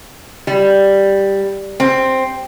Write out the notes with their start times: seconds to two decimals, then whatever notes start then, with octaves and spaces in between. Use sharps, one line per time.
0.47 G3
1.80 C4